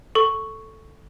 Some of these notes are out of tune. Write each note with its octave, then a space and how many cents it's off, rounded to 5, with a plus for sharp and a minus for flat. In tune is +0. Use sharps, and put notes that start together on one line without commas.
A4 +0 C#6 +0